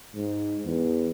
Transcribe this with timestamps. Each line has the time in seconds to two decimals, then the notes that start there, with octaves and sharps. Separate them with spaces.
0.16 G#2
0.65 E2